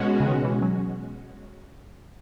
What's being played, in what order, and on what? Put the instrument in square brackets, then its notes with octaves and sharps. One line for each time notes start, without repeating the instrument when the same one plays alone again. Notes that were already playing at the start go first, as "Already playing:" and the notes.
Already playing: [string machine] B2 G#3 C#4 F#4
[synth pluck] C#3
D#3
E3
F#3